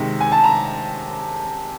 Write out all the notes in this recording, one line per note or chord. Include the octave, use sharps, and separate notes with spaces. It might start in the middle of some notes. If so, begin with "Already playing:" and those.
Already playing: C3 D#3 G#3
G#5
A5
A#5